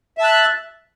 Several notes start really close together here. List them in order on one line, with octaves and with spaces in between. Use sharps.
E5 A5 F#6